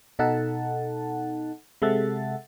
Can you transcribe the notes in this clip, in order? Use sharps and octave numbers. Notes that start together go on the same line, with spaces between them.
B2 D#4 A4 F#5 A5
C3 G#3 A4 E5 F#5 A6